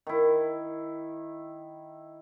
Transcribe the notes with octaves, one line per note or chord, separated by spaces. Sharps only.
D#3 E4